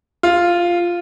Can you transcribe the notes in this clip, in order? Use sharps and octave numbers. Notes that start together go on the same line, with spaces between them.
F4